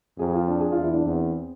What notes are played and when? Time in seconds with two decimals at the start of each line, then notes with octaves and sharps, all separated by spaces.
0.18 F2 G#4
0.33 F4
0.48 D4
0.60 G#4
0.72 E2 F4
0.83 E4
0.94 D4
1.05 E2 C4